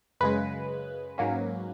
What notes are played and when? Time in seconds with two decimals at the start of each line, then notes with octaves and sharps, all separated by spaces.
0.21 F#2 C#3 G#3 B4
1.18 G#2 F#3 A#3 C#4